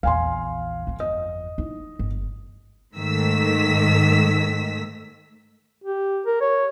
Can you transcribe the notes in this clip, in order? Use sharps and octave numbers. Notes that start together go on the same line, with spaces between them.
A#1 E2 F5 G#5 C6
G1 F2
D#5
D#4 E4
G1
G#2 D#3 A3 E6 B6
G4
A#4
C#5